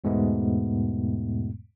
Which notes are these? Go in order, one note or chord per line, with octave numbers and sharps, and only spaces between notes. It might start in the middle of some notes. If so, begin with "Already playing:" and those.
E2 G#2 B2 G#3 A3 B3